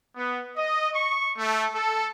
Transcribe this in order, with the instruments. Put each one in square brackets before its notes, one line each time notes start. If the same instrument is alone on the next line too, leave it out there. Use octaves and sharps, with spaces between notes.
[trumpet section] B3
D#5
C#6
A3
A4